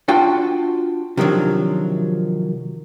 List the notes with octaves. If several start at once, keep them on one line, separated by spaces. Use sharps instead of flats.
D4 F4 F#4 G5
C3 D#3 F3 F#3 D4